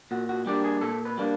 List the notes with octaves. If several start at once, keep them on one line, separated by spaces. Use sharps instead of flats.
A#2 F#4
F#4
G3 A#3 D4 G4
G#4
A#2 A4
B4
G3 A#3 D4